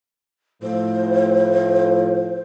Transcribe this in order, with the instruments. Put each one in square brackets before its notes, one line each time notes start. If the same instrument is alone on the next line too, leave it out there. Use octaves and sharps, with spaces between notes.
[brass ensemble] A2 F3 [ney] C5